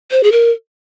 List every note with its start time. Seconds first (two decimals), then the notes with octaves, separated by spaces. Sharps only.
0.11 C5
0.23 G#4
0.32 A#4